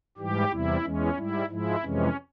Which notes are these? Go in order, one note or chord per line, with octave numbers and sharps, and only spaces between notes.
G#2 E3 G3 G4
E2 C3 G3 E4
E2 E3 G#3 C#4
G#2 G3 E4
G#2 F3 G#3 E4
F2 C3 E3 G#3 C#4